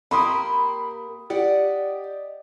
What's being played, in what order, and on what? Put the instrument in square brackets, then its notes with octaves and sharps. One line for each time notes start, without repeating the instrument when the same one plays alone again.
[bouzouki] A#3 G4 A#4 [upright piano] B5 C6 D#6
[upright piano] G4 [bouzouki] D5 D#5 F#5